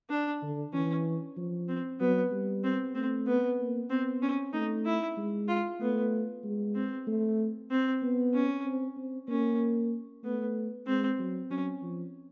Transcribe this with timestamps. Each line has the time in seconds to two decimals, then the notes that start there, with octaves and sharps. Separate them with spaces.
0.10 D4
0.42 D3
0.74 E3 C#4
1.37 F3
1.69 C4
2.00 F#3 B3
2.31 G3
2.64 C4
2.95 A3 C4
3.27 B3
3.59 A#3
3.90 B3 C4
4.22 C#4
4.53 A3 D#4
4.85 E4
5.17 G#3
5.48 F4
5.80 A3 B3
6.44 G#3
6.75 C4
7.07 A3
7.71 C4
8.02 B3
8.34 C#4
8.66 C4
8.97 C4
9.28 A#3 C#4
10.24 A3 B3
10.87 G#3 C4
11.19 F#3
11.50 F#3 C#4
11.82 F3